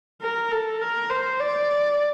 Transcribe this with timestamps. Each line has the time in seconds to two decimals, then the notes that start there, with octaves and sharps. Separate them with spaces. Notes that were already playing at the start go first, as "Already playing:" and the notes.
0.22 A#4
0.51 A4
0.81 A#4
1.10 C5
1.40 D5